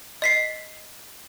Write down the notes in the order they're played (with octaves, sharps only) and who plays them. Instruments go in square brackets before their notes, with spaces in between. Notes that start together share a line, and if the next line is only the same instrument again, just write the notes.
[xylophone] D#5 B6 C7